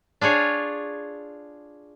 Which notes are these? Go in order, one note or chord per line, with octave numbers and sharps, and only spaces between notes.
D4 F4 G#4 C#5